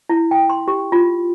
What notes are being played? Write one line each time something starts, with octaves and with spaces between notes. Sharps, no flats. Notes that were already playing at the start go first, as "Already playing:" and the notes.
E4
G5
C6
G4
F4